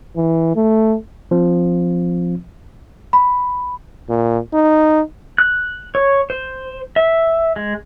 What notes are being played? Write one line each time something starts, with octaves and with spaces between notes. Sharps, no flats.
E3
A3
F3 C4
B5
A#2
D#4
F#6
C#5
C5
E5
G#3